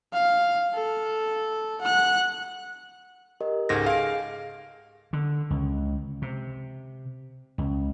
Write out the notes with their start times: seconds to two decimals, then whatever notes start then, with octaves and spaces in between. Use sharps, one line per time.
0.13 F5
0.74 A4
1.81 F#5 F#6
3.41 G4 A#4 D#5
3.69 C#2 G#2 G#4 A4 A#6
3.86 G#4 F5 D7
5.13 D3
5.50 C#2
6.22 C3
7.58 C#2